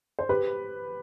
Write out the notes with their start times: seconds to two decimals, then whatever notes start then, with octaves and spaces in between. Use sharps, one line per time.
0.19 C5
0.29 G4 B4